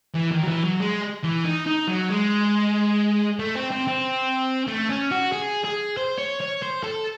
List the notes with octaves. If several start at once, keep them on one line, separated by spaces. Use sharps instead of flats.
E3
D#3
F#3
E3
F#3
G#3
E3
D#4
D#4
F#3
G#3
A3
C4
C4
C4
A3
C#4
F#4
G#4
G#4
C5
C#5
C#5
C5
A4